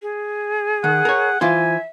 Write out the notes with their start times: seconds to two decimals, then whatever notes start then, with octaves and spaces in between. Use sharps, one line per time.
0.02 G#4
0.84 D#3 F#5
1.05 A#4 C#5
1.41 E3 F4 C5 E5 G#5